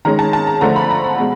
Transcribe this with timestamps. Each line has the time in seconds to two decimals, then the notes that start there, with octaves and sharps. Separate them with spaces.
0.05 D#3 G#3 C#4 A#5
0.19 A5
0.33 A5
0.47 A#5
0.61 D3 F3 A3 A#5
0.76 B5
0.91 A#5
1.04 B5
1.19 B2 G#3